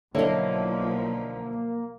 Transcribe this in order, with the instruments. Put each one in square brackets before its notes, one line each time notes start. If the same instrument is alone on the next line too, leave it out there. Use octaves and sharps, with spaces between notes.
[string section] B1 F3 [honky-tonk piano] D3 E4 A4 [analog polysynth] A#3 [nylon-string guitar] C#5 D#5